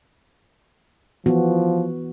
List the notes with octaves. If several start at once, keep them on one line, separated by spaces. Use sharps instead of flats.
E3 F3 B3 F#4